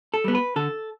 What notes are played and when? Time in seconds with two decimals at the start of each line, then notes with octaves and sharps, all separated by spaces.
0.14 A4
0.24 G3 B3
0.35 B4
0.56 D3 A4